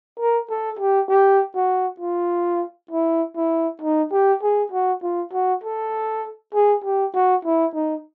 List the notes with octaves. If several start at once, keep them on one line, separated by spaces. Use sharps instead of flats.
A#4
A4
G4
G4
F#4
F4
E4
E4
D#4
G4
G#4
F#4
F4
F#4
A4
G#4
G4
F#4
E4
D#4